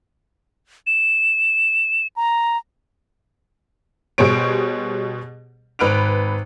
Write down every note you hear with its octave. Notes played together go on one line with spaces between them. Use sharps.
E7
A#5
B2 G3 G#4 C5 C#5 D7
G#1 B4 F#6 D7 F7